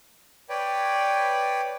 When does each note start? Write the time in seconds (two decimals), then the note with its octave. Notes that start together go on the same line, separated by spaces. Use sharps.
0.49 B4 C#5 D5 G5